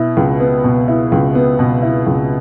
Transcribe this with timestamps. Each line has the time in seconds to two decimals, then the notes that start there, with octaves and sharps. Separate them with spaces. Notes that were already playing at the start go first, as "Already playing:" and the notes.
Already playing: B2 E4
0.17 C#2
0.40 B3
0.64 B2
0.88 E4
1.12 C#2
1.35 B3
1.59 B2
1.83 E4
2.07 C#2